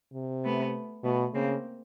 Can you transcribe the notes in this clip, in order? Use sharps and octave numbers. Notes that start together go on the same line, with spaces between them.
C3
A3 B3
B2 A3 B3
C#3 A#3 C4